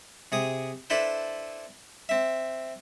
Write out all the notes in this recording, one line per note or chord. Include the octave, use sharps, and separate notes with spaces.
C3 G#4 D#6
D4 E4 A4 B4 C5
C4 E5